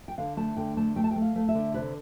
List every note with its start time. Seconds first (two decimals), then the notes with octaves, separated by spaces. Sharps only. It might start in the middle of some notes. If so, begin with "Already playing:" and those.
0.08 G5
0.18 D3 F5
0.37 A3 A5
0.56 D3 G5
0.77 A3 A5
0.96 A3 G5
1.04 A5
1.11 A3 G5
1.22 F5
1.36 A3
1.49 E5
1.55 D3
1.74 C3 B4